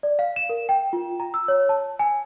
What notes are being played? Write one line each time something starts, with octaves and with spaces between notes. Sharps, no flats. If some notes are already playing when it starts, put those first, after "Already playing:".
D5
F5
E7
A#4
G5
F4
A#5
E6
C#5
A5
G#5